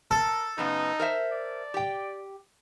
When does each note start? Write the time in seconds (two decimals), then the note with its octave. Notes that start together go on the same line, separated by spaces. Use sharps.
0.11 A4 A#4
0.58 F#2 C#3 B3 D#4
0.99 A#4 C5 E5
1.32 D5
1.74 G4 G5